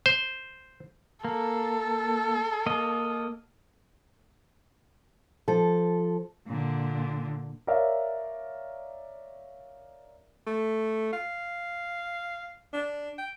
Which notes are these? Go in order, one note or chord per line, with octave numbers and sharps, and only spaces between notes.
C5
A#3 A4
A#3 D#5
F3 A4
A#2 D3
A#4 C#5 D5 E5 F5
A3
F5
D4
G5